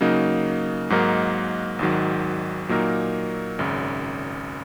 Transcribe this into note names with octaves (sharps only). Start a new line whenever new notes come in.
C#3 F#3 A#3 D#4
G#2 F#3 A#3 D#4 A#4
G#1 G#2 D#3 F#3
A#2 F#3 A#3 D#4 A#4
G#1 F#2 C#3